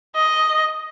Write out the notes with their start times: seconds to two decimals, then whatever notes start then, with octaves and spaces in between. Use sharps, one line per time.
0.16 D#5